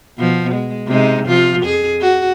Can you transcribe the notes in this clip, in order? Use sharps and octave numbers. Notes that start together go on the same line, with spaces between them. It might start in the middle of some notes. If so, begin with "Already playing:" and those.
B2 F3
G#3
C3 G#3 D#4
C3 F3 F4
F2 G#4
F#4